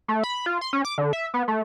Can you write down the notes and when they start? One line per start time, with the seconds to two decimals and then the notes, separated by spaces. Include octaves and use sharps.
0.08 A3
0.24 B5
0.46 F4
0.61 C6
0.73 C#4
0.85 D6
0.98 D3
1.13 E5
1.34 B3
1.48 A3